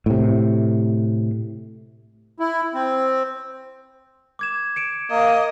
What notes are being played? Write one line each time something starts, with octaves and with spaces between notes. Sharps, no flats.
A2 C3
E4
C4
D6 G#6 E7
C#7 D7 E7
A#3 D#5